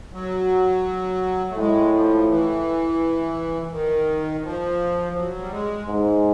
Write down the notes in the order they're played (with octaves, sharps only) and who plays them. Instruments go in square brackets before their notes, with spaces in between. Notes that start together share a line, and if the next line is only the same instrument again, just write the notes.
[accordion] F#3
A3
[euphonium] A2 [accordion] G#3
[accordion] F3
E3
D#3
F3
F#3
G3
G#3
[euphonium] G#2